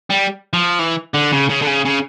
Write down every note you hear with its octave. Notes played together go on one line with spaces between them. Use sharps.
G3
F3
E3
D3
C#3
C#3
D3
C#3
C#3